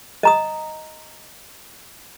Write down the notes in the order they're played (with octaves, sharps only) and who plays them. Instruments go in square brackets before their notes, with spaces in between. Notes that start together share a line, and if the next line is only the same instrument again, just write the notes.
[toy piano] D#5 A#5 D#6